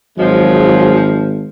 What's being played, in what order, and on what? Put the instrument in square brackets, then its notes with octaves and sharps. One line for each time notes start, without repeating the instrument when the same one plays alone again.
[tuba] G#1 [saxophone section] F3 G#3 [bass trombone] F#3